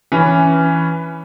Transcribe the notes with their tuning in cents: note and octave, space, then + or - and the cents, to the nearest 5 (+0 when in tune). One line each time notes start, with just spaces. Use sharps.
E3 +0 C#4 +0 B4 +0